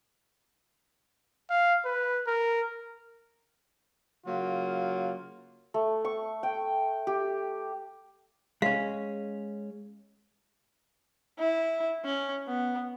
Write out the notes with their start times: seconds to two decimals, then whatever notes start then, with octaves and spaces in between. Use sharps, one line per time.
1.50 F5
1.85 B4
2.27 A#4
4.26 C#3 F#3 A#3 F4
5.74 A3
6.05 C#6
6.43 G5
7.07 G4
8.62 G#3 C#4 F5
11.39 E4
12.05 C#4
12.48 B3